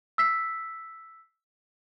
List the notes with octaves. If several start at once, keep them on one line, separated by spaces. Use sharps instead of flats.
E6 B6 C7